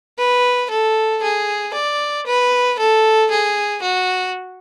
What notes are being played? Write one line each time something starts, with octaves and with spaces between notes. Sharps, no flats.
B4
A4
G#4
D5
B4
A4
G#4
F#4